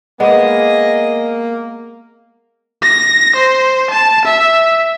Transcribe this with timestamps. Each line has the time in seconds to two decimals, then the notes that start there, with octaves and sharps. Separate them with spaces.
0.20 G#3 A#3 B3 G#4 D#5
2.82 A#6
3.36 C5
3.91 A5
4.25 E5